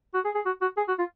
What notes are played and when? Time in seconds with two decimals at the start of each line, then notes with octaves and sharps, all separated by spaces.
0.14 F#4
0.25 G#4
0.35 G#4
0.46 F#4
0.61 F#4
0.77 G#4
0.88 F#4
0.98 F4